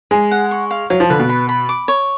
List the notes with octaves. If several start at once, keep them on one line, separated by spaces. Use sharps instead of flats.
G#3 G#4
F#5
C#6
F5
F#3 F5
F3
D3 B4
B2
B5
B5
D6
C#5